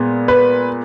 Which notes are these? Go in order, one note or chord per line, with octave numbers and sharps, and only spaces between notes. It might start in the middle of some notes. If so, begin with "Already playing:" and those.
Already playing: A#2 G#3 B3
B4